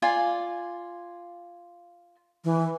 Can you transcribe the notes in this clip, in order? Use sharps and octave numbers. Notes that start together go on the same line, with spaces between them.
F4 D5 G#5
E3